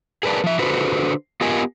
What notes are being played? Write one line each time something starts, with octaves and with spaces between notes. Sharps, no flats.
G#4 A#4 B4 D5 A5
F3 E5
D3 D4 F#4 A4 B4 C5
B3 F4 G4 A#4 D#5 G#5